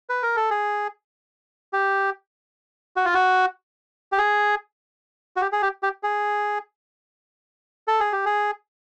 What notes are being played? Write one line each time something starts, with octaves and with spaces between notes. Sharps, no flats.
B4
A#4
A4
G#4
G4
F#4
F4
F#4
G4
G#4
F#4
G4
G#4
G4
G4
G#4
A4
G#4
G4
G#4